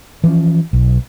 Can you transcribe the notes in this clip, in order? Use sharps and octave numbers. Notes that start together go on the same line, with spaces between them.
E3 F3 C#4
B1